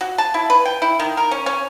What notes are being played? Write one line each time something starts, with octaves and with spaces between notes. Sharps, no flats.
F#4
A5
E4
B4
G5
E4
D#3
A#4
C#4
C#4